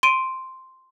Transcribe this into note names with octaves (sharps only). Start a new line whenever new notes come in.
C6 D7 D#7